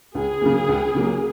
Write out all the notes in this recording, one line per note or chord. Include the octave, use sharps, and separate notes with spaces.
C#2 G#4
C#3 F#3 A#3
C#2
C#3 F#3 A#3